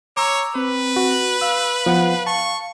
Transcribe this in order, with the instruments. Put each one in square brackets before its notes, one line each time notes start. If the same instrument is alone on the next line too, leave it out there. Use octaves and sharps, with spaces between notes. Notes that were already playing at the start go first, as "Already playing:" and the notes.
[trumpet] C#5 [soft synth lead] A#5 [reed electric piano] D6 E6
[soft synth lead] C4 [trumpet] B4
[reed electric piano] F#4
[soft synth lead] F5 [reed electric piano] E6
[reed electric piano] F3 B3 F#5
[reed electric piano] A5 [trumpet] C#6